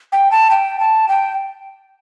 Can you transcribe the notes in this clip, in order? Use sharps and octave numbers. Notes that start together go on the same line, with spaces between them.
G5
A5
G5
A5
G5